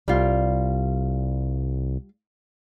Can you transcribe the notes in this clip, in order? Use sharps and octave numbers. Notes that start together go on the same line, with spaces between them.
C2 G3 F4